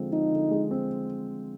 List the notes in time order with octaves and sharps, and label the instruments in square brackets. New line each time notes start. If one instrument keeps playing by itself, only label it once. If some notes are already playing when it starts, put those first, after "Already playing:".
Already playing: [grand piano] D3 F3 G#3 C4
[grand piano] F3 [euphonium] D#4
[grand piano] D3
G#3
C4